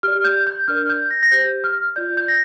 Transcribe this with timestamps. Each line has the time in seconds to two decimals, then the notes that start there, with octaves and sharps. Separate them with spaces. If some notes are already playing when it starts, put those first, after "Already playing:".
0.03 G4 D5 F6
0.24 G6
0.47 G6
0.68 D4 A#4 D5 F6
0.89 G6
1.11 A#6
1.23 A#6
1.31 G4 C5 G6
1.64 F6
1.96 F4 D5 G6
2.17 G6
2.28 A#6